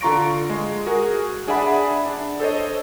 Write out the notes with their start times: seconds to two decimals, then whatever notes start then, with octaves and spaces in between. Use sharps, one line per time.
0.01 D3 F4 A#5 C#6 A#6 D7
0.50 G#3
0.87 F#4 G#4 A#4
1.47 D4 G#4 D5 E5 F#5 B5
2.06 D4
2.40 A4 C5 C#5 D#5